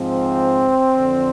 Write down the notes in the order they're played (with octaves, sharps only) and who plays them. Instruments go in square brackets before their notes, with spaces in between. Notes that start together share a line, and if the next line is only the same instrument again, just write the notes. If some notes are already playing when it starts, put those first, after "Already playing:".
Already playing: [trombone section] G#2 F3 C4
F2 D3 F3